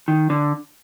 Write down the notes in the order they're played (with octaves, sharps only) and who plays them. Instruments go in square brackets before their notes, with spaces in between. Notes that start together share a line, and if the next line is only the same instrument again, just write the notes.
[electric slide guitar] D#3
D3